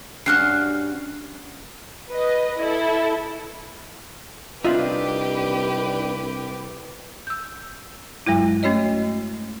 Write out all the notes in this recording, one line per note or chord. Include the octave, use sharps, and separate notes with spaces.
G2 C#4 F#4 F6 F#6 C7
B4 D#5
E4 A4
C2 C4 D4 D#4 F4 G4 B4 E5
E6 G6
G2 F#3 G#3 E4
A3 C#4 F#4 C#5 D#5